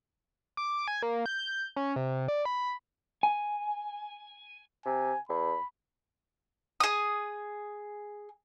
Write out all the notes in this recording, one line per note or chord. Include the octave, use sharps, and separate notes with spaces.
D6
G#5
A#3
G6
C#4
C3
D5
B5
G#5
C3 G#5
E2 B5
G#4 D#6